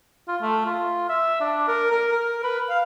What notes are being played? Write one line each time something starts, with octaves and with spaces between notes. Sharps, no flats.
F4
A3
F4
E5
D4
A#4
A#4
A#4
B4
F5